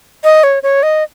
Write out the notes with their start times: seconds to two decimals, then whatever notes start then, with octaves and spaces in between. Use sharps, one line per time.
0.24 D#5
0.43 C#5
0.63 C#5
0.83 D#5